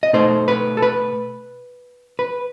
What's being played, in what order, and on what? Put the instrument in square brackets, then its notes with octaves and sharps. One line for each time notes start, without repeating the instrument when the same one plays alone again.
[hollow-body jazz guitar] D#5
B2 A3 D#4 C5
B4
A4
B4
B4